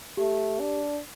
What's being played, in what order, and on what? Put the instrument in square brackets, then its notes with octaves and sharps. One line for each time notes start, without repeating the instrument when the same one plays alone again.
[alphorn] A3 [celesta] G4
[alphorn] D4